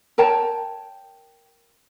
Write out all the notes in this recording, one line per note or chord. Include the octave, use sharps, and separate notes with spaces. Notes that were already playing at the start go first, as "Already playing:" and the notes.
A#4 C#5 G5 A5